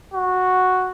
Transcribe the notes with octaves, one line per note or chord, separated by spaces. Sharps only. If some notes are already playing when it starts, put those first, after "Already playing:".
F#4